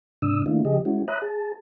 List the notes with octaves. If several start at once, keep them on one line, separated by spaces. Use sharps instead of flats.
G#2 C3 D4 D#6 E6
D#3 A3 A#3 D4 E4 F4
C#3 F3 G4 G#4 D#5
G#3 C#4 E4 F#4
C#5 E5 A#5 B5 D#6 F#6
G#4 A5